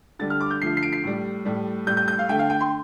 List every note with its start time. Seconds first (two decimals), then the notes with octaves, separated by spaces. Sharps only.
0.19 D3 G3 A6
0.30 F6
0.40 D6
0.51 G6
0.62 D3 F3 A3 C7
0.77 C7
0.83 D7
0.93 C7
1.04 A2 G3
1.45 A2 G3
1.87 A2 G3 G6
1.97 G6
2.08 G6
2.19 F5
2.29 D3 A3 G5
2.39 F5
2.50 G5
2.61 C6